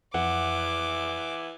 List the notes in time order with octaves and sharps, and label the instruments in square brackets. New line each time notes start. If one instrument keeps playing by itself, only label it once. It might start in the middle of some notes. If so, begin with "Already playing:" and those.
[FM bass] F2 [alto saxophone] E3 [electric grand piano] F#5 [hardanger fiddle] D6